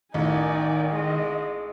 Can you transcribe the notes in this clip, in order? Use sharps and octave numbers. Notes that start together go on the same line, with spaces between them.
A1 D#3 D#4 D5 G#5
G#3 D#5